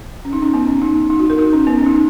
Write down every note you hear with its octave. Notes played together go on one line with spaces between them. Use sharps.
C#4
D#4
C#4
B3
C#4
D#4
D#4
F#4
A#4
D#4
C#4
B3
C#4
D#4